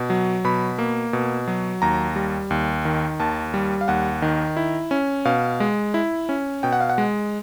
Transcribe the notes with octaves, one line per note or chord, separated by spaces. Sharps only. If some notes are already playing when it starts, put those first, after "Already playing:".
Already playing: B2
F#3
B2 B5
A#3
B2
F#3
D#2 A#5
G3
D#2
D#3
D#2 A5
G3
F5
D#2 F#5
D#3
E4
C#4
B2 F5
G#3
E4
C#4
B2 G5
F#5
F5
F#5
G#3